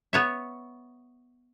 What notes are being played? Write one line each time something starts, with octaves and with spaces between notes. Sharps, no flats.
B3 C#5 E5